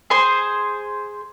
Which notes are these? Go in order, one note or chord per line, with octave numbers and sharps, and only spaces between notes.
G#4 C5 C6